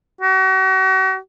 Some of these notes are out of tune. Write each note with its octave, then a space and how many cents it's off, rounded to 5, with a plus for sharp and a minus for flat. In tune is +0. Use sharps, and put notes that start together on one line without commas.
F#4 +40